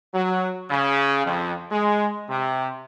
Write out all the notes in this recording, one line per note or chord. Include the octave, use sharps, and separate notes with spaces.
F#3
C#3
F2
G#3
C3